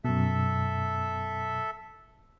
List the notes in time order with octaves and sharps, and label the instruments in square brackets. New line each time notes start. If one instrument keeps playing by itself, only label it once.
[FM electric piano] F#2 B2 [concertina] A4 E5